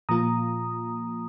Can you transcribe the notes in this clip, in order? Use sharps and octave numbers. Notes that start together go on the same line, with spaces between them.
A#2 F3 A#3 F4 A#5 D#6